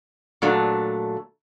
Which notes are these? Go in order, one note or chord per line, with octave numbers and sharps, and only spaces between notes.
A#2 F#3 A3 D4